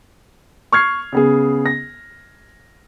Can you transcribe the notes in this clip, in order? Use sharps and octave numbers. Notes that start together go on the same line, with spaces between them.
C#6 F6 G#6 C7
C#3 B3 G#4
A#6